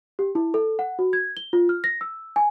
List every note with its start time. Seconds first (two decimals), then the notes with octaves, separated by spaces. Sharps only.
0.19 G4
0.35 E4
0.54 A4
0.79 F#5
0.99 F#4
1.13 G#6
1.37 G7
1.53 F4
1.69 F6
1.84 A#6
2.01 E6
2.36 G#5